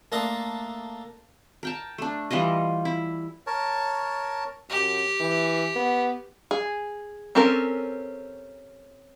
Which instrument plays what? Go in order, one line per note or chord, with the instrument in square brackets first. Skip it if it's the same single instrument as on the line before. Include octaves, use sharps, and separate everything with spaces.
[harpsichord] A3 A#3 D4 A#5 C6 D#6
[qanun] A#4 G5 A5
A3 D4
E3 G3 F4 D#5
E4
[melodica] A#4 C#5 A5
[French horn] F#2 [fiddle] G4
[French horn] E3
B3
[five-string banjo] G#4
C4 C#4 G4 A4 A#4